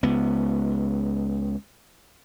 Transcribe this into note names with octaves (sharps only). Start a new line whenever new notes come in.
C#2 B3